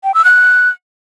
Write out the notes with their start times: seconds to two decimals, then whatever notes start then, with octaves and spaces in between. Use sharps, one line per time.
0.04 G5
0.14 E6
0.25 F#6